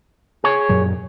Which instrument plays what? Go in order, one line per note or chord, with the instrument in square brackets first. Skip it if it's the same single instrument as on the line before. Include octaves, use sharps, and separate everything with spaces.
[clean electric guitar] G#4 C#5
[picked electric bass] F#2 A#2 F#3